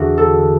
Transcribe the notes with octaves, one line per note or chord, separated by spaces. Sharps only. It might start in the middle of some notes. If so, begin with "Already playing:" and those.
Already playing: E2 D3 F#4
A4